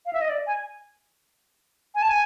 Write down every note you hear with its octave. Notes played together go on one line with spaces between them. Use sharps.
F5
E5
D#5
D5
G#5
G#5
A5
G#5